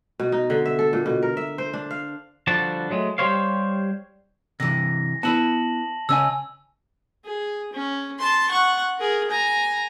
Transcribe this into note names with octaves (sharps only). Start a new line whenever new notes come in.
B2
D#4
D3
E5
A4
A#2
B2
A#4
E5
C5
D4
F5
D3 F3 G3 D4 F#4 A5
F#3 G#3 A3
G3 G4 G#4 C5 C#5 F5
C3 E3 A#6
B3 E4 B4 A5 F#7
C#3 C#4 D#5 G#5 E6
G#4
C#4
A5 C6
F#5 C#6
G#4 A#4
G#5 A#5